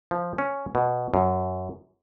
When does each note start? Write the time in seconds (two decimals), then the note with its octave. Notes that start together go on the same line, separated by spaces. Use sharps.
0.11 F3
0.38 C#4
0.75 B2
1.14 F#2